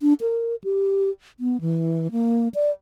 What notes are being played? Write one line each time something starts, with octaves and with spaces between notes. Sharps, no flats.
D4
A#4
G4
B3
E3
A#3
D5